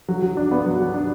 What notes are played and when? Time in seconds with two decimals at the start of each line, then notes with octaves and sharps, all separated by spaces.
0.09 F#3
0.22 F#3
0.37 D4
0.51 B3
0.66 F#3
0.80 F#3
0.94 D4